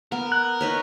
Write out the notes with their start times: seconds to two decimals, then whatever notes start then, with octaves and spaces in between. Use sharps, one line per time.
0.12 B3 A#4
0.32 F#6
0.61 D#4 B4 C#5